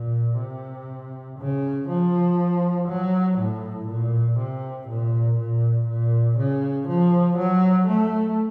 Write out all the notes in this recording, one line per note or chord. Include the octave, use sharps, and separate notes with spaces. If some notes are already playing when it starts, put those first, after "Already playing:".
Already playing: A#2
C3
C#3
F3
F#3
A2
A#2
C3
A#2
A#2
A#2
C#3
F3
F#3
A3